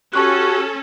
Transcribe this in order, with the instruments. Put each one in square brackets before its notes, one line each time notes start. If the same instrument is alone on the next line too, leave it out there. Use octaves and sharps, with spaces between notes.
[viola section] C#4 A4 [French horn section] F#4 G4 [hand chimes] A5 C#6 F#6